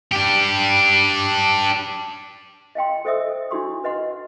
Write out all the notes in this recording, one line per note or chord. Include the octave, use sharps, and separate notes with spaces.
D4 G4
D#5 F5 G5 C6
A4 C5 D#5 E5 D#6 E6
D4 D#4 F#4 C6 C#6
B4 D#5 F#5 C6